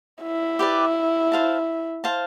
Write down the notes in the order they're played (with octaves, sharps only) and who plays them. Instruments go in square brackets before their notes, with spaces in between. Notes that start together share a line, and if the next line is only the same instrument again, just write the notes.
[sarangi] E4
[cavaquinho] G4 B4 D5
C5 F5 A5
C5 F5 A5